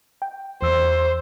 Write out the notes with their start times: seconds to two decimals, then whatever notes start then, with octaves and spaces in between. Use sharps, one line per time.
0.22 G5
0.62 E2 C5 E6